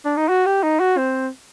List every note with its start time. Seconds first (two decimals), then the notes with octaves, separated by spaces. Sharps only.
0.05 D4
0.17 D#4
0.29 F#4
0.46 G4
0.63 D#4
0.80 F#4
0.98 C4